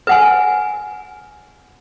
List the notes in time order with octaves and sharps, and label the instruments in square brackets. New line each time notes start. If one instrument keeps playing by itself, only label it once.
[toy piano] B4 F#5 G#5